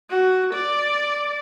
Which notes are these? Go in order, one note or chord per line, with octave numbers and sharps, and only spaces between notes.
F#4
D5